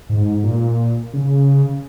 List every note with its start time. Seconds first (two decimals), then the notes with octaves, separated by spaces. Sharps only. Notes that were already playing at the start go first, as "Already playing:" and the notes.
0.09 G#2
0.43 A#2
1.13 C#3